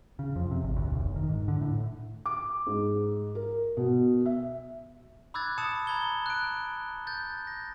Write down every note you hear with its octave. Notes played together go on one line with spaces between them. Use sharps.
C#3
F2
C3
G#1
D2
B1
F1
D#3
G#2
D3
A2
D6
G#2
A#4
B2
E5
B5 D6 E6 F#6 G#6 A6
A5 B5 D#6 C#7 E7
A#5 B5 G#6 G7
F#6 D7
G6 A6
A#6